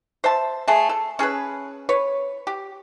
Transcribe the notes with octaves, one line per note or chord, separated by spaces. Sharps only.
C5 E5 A5
A3 G#4 A4
A4
C#4 G#4 A4 B4
B4 C#5
G4